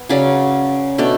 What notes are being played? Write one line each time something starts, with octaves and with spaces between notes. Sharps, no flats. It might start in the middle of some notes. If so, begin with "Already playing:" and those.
Already playing: B3
C#3 F#3 C#4 D5
B2 A3 D4